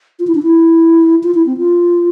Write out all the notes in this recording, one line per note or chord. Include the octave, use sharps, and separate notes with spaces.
F4
E4
D4
E4
F4
E4
C4
F4